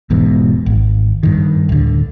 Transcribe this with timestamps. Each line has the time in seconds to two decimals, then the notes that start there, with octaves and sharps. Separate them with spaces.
0.10 E1 E2 G#2 B2
0.66 G#1
1.23 G2 D#3
1.69 D1 D3